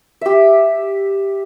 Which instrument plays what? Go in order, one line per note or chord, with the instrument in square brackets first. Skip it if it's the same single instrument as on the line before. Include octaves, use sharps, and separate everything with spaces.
[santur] G4 E5